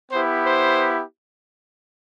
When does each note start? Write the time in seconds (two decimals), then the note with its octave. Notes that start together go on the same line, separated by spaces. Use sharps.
0.11 B3 E4 G4 C5
0.44 C5